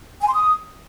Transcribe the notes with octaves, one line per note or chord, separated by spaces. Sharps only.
G#5
C6
D#6